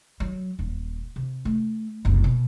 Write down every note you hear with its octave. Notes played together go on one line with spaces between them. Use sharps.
F#3
D#1
C3
A3
F#1 C2
B2